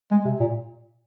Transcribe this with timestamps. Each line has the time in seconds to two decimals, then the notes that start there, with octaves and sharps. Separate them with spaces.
0.11 G#3
0.25 C3
0.40 A#2